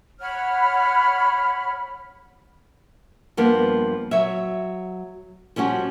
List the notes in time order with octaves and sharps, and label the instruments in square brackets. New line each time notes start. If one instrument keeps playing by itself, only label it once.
[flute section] C#5 F#5 B5 F6
[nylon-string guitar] G2 F3 A#3 B3
F#3 C#5 E5
F3 G3 C#4 F#4